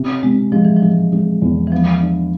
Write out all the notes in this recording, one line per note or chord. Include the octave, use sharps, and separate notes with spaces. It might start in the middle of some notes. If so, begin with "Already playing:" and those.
Already playing: C3
C3 G#3
F3 G#3
E3
F3
G#3
G#3
E2
E3
F3 B3
D4